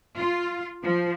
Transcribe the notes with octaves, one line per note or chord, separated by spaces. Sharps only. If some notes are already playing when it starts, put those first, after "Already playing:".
F4
F3